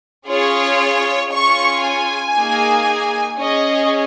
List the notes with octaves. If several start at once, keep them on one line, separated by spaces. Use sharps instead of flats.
C#4 F4 G#4 C#5
C#4 F4 G#4 C#6
G#5
A#3 D#4 G#4
C#4 G#4 D#5